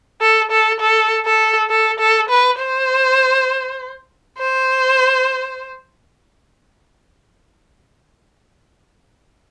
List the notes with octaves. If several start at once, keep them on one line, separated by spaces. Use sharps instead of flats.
A4
A4
A4
A4
A4
A4
B4
C5
C5